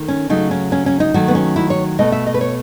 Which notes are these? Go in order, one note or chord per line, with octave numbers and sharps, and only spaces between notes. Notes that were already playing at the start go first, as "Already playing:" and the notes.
Already playing: D#3 A3
C#4
C#3 F#3 A3 D#4
C#4
C#4
C#4
D#4
D#3 F#3 A3 F#4
B3
C#4
E4
C#5
B2 A3 D#5
E5
D#5
B4
C#5